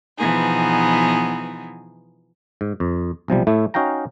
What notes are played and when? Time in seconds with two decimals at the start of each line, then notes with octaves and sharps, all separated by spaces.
0.18 B2 E3 F3 B3 D#4 G#4
2.61 G#2
2.80 F2
3.28 B1 C3 F3 G3
3.47 A2 A3 E4
3.74 C#4 D#4 F#4 F5 G5 A#5